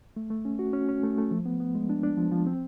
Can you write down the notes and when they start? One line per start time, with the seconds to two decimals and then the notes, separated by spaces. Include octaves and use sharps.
0.16 A3
0.30 A3
0.45 C#4
0.59 F#4
0.73 C#4
0.89 C#4
1.03 A3
1.18 A3
1.31 F3
1.46 B3
1.60 B3
1.75 G#3
1.89 D4
2.04 D4
2.18 F3
2.32 F3
2.47 C4